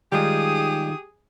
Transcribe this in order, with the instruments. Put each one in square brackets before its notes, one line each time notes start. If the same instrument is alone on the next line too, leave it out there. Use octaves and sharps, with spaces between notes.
[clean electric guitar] D#3 D#4 F4 [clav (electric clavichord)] G3 G#3 [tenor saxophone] G4 [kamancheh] G#4 D#6